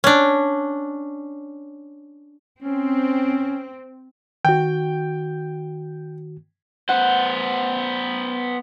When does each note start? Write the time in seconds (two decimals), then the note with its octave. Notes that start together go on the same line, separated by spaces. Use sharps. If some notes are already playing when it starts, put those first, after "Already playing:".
0.04 C#4 D4
2.62 C4 C#4
4.45 D#3 F#4 G5
6.89 B3 C5 F#5